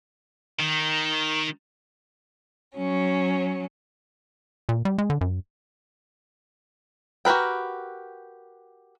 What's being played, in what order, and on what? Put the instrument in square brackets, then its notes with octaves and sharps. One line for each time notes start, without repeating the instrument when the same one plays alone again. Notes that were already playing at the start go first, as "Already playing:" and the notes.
[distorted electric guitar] D#3
[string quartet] F#3 C#4
[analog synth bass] A#2
G3
G#3
D3
F#2
[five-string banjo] F#4 G4 A#4 B4 G5